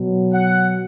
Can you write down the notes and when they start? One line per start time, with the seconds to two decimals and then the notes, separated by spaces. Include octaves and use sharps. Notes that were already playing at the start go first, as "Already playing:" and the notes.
Already playing: B2 F#3
0.31 F#5